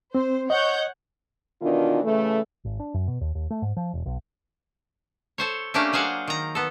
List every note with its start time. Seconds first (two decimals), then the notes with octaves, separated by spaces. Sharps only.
0.15 C4 C5
0.50 C#5 D#5 F#5 G6
1.61 B2 D#3 E3 D4 F4
2.02 C#3 E3 A3
2.65 G#1
2.80 D4
2.94 F#2
3.07 B2
3.21 D#2
3.35 D#2
3.51 A3
3.62 G#2
3.77 F3
3.93 E1
4.06 B1
5.38 A4 C5 C#5
5.74 A3 A#3 C#4 D4 G4 A4
5.93 F#3 G#4 C5 F5 F#5
6.28 D#3 A#5
6.55 B3 A4